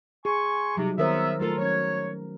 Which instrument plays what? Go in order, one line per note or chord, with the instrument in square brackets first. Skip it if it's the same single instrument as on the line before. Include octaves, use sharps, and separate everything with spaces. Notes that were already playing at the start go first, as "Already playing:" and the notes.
[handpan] G#4 [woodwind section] G#5 C6 C#6
[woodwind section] C3 [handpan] F#3 G3 D#4
[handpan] D#3 A#4 C5 [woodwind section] F#3 B3 E5
[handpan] F#3 A3 A#4 [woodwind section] F4 A4
[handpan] F#3 C#4 [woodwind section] C#5